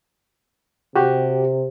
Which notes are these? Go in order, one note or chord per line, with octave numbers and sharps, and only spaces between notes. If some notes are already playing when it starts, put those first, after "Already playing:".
C3 F#4 G4